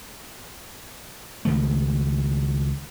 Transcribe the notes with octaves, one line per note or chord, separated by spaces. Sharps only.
C#2 D#3 A3